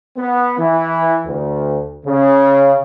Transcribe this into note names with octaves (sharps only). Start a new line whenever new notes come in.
B3
E3
D2
C#3